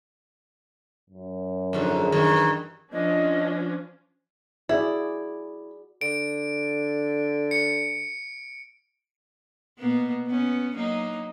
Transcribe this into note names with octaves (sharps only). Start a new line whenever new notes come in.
F#2
F2 G#2 D3
G2 D#3 E3
F3 C#4 D4 D#5
E4 F#4 G#4 D5
D3 D7
C#7
B2 A#3 B3
B3 C#4
F#3 A#3 D#4